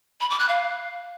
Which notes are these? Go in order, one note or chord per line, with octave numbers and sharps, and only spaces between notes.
B5
D6
F#6
F5